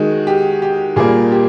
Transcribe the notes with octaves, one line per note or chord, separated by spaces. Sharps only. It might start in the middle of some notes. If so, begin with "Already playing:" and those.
Already playing: D#3 G#3 F#4
G4
G4
A#2 G3 A#3 G#4
G4